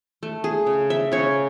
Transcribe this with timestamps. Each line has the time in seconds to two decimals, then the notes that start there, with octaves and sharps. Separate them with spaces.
0.23 A3
0.44 G#4
0.67 C#3
0.90 E5
1.12 C#3 C#5